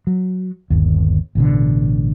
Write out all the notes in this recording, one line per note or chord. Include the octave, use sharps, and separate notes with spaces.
F#3
G1 D#2
A1 B2 D3